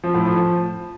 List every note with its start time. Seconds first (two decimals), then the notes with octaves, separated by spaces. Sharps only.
0.04 F3
0.14 A2
0.25 F3